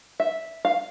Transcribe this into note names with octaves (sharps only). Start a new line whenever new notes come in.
E5
F5